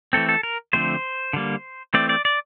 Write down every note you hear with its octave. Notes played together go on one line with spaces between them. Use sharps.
E3 A3 C4 A4
A4
A#4
D3 F3 A3 C4 C5
D3 G3 A#3
E3 A3 C4 D5
D5
D5